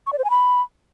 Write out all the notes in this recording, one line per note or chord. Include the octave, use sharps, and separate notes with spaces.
C#6
D5
C5
G#5
B5